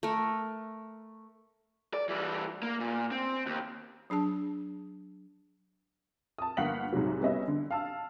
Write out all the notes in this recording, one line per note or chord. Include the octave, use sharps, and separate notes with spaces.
A3 A#4
D5
E3 G3
A#3
A#2
C4
D#2
F#3 D4 G#4 A5
A5 D#6
G1 A#3 F5 F#5 B6 F#7
C2 G#2 C3 F#3
G3 B3 C#4 D#5 E5
D3
F5 A5 E6